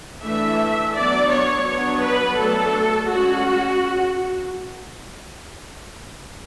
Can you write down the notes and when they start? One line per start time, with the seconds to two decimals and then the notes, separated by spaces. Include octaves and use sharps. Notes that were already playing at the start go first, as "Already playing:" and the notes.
0.21 E3 A3 D4 E5
0.93 F#3 B3 D4 D5
1.29 C#5
1.65 F#3 B3 D4 C#5
2.01 B4
2.37 F#3 A3 D4 A4
3.09 G#3 C#4 F#4